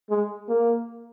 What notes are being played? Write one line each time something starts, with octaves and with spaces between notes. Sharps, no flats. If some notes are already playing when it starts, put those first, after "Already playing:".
G#3
A#3